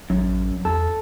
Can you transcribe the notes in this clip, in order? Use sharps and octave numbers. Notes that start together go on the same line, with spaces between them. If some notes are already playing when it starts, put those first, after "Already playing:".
A1 F#2
E2 A4